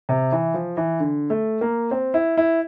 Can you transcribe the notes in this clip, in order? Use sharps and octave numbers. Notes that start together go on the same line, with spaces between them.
C3
E3
F3
E3
D3
A3
A#3
C4
E4
E4